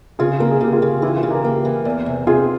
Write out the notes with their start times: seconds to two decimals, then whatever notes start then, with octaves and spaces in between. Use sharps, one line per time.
0.19 C#3 F4 G#4
0.40 A#3 A#4
0.51 G#4
0.60 C#3 G4
0.73 F4 G#4
0.82 C#3
0.99 G#4
1.02 E3 E4 G4
1.16 F4 G#4
1.23 C#3
1.31 G4 A#4
1.44 A#3
1.65 E3
1.85 E2
2.06 C3
2.27 C3 F4 G#4